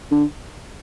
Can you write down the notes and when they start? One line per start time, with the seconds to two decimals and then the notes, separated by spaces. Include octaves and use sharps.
0.11 D3